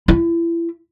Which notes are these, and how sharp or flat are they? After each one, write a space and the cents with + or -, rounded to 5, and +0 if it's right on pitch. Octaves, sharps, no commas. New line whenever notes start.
E4 +30